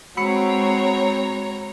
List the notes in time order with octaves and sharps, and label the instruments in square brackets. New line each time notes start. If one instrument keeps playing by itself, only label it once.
[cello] G#3 C4 [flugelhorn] F#4 [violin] C#5 A#5 [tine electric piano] B5 E6 C#7